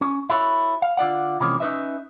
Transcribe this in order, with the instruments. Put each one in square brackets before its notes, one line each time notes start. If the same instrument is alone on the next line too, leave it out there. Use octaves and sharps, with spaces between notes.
[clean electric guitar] C#4
E4 F#4 A4 C#5
F5
D3 F4 D5 F#5
C3 E3 F3 G#3 A#3 C#4
C#4 D#4 E4 B4 D#5 E5